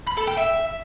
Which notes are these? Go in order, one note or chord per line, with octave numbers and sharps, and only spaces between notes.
B5
A4
G5
E5